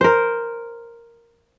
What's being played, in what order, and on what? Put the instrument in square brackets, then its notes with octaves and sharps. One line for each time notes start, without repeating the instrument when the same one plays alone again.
[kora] A#4 C5